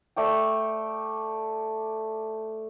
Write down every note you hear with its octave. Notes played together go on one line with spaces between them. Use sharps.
A3 D5 G5